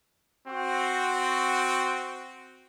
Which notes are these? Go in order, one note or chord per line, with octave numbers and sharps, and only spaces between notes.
C4 F#4